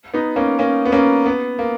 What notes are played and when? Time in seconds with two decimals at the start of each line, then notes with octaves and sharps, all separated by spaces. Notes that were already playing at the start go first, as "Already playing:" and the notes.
0.14 B3 D#4
0.36 A#3 C#4
0.59 A#3 C#4
0.86 B3
0.92 A#3 C#4
1.26 B3
1.59 A#3